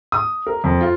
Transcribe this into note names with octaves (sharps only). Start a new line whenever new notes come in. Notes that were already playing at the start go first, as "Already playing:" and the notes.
D#6
A#4
F2
F4